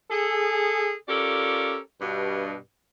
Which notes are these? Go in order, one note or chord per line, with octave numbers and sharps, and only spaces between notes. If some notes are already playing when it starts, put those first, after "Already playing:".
G#4 A4
C#4 F4 G4 A4 A#4 D5
G2 B2